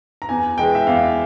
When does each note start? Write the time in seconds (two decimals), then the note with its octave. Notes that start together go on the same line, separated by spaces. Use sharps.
0.22 A#5
0.29 E2 G#5
0.58 E3 G#3 G5
0.75 E5
0.87 E2 F5